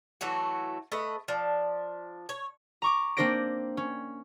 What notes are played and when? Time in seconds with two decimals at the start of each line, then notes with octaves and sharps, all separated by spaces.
0.21 E3 F#3 A3 F#4
0.92 A3 B4 D#5
1.28 F3 D4
2.29 C#5
2.82 A#5 C#6 D6
3.17 A#3 C4 D4 C5 A#6 D7
3.77 C#4